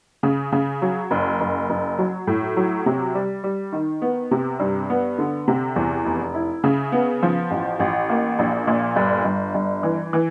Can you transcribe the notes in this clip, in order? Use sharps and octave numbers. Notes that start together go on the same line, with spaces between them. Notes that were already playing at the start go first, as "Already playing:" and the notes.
C#3
C#3
F#3
F#1
F#1
F#1
F#3
A2
F#3
C3
G3
G3
D#3
B3
C3
G2
B3
D3
C3
E2
F1
E4
C#3
B3
F3
A1
A1
A#3
A#1
A#2
G1
G1
G1
E3
E3